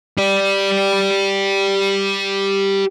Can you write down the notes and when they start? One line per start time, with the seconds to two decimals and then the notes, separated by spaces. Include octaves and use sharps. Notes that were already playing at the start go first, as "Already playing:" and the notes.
0.18 G4 D5